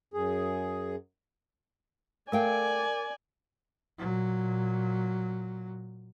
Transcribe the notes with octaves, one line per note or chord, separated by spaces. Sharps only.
F#2 G#4
A3 A#4 D5 F5 G5 G#5
A#2 F#3